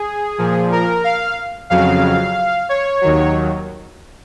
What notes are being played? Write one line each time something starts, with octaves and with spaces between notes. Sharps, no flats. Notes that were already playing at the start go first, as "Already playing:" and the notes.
Already playing: G#4
A#2 F3
A#4
F5
F2 C#3 F#3 F5
C#5
D#2 D#3 F#3